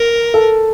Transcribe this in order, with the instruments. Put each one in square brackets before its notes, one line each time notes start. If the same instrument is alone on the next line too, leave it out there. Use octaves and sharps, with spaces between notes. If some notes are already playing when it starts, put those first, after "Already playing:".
Already playing: [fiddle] A#4
[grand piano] A4